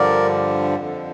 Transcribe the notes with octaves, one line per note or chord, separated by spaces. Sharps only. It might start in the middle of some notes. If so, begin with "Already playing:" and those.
Already playing: G2 D3 F3 A#4 D5
F2 D3 F3